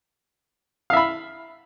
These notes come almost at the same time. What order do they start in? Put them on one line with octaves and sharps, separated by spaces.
F5 E5 B5